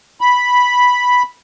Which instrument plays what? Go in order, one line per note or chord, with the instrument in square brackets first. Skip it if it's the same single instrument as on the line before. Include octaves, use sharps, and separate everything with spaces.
[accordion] B5